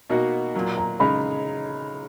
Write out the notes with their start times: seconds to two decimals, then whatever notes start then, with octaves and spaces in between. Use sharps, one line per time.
0.10 B2 A#3 D#4 F#4
0.55 A#2 F#3 A#3
0.78 A#5
1.00 C#3 G#3 D#4 B5